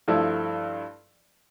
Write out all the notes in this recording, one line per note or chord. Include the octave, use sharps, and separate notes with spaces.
G2 F3 A3 E4